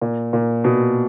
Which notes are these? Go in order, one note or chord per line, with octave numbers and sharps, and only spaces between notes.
A#2
A#2
B2